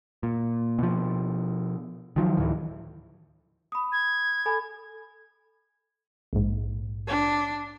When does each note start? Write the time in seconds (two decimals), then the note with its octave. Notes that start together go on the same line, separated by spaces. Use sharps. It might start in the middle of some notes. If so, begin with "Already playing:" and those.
0.23 A#2
0.79 B2 F3
2.16 D#3 F3 F#3
2.38 D2 A2 D#3 E3
3.72 B5 D#6
3.92 G#6
4.46 A4 G#5 B5
6.33 A#1 G#2
7.08 D4